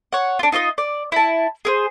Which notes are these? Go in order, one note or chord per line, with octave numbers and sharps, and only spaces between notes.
C#5 F#5
D4 F4
D#4 F4 C5 D#5
D5
E4 A5
G#4 A#4 C5